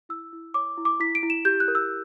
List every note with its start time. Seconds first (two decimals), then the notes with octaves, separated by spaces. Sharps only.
0.09 E4 E6
0.33 E4
0.54 C#5 D6
0.77 E4
0.85 D6
1.00 E4 B6
1.15 D7
1.23 E4
1.30 E7
1.45 G4 G6
1.60 F#6
1.68 A#4
1.75 E6